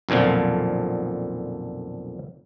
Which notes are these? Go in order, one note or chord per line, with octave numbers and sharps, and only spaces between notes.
B1 F2 A#2 D3 F3